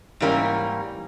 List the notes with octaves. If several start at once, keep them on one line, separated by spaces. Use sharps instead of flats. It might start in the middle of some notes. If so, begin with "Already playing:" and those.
G#2 E3 G3 A#3 C#4